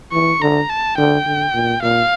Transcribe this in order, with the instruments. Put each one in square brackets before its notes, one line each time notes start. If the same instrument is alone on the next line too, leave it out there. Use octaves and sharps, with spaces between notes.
[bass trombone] E3 [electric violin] C#6
[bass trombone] D3 [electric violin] A#5
[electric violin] A5
[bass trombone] D3 [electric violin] G5
[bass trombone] D3
A#2
[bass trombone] A#2 [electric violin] F5